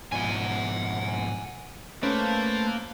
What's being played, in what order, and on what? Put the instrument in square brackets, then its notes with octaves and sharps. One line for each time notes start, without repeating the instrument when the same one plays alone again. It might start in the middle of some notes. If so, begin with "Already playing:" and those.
[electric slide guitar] G#2 B2 F3 [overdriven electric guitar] F#5 G#5
[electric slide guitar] A3 [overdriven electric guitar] A#3 [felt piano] C#4 [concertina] B4 C5 A5